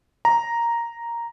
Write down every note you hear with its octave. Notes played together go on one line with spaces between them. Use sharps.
A#5